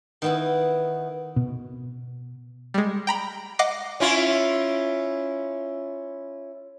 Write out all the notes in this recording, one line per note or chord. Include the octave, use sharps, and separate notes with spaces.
D#3 B3 E4
B2
G3 G#3
G5 A#5 B5
D#5 F#5 D6 A#6 C7
C#4 E4 F4